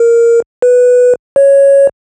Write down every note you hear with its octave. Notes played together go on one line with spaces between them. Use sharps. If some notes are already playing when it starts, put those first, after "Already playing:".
Already playing: A#4
B4
C#5